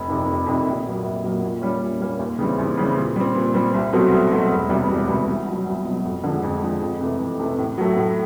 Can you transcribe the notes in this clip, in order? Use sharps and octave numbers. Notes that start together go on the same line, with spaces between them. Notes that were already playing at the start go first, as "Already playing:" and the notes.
Already playing: F1
F2 C3 D#3
F1
F2 C3 D#3
A#1
A#2 F#3 A#3
A#1
A#2 F#3 A#3
A#2
G3 A#3 C#4
A#2
G3 A#3 C#4
D#2
C#3 E3 G3 C4
D#2
C#3 E3 G3 C4
A#2
G3 C4
A#2
G3 C4
C2
B2 F#3 A3 C4
C2
B2 F#3 A3 C4
E1
D2 C3 E3 G3
E1
D2 C3 E3 G3
C2
B2 F#3
C2
B2 F#3
F2
D3 F3 G#3
F2
D3 F3 G#3
F2
C3 E3 A3
F2
C3 E3 A3
A2
F#3 A3
A2